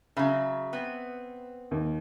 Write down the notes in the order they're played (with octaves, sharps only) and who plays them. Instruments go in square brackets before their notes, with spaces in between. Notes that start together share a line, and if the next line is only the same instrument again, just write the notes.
[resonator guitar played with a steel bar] C#3 F#3 [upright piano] E5 B5
[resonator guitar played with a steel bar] B3 C4
[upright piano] D#2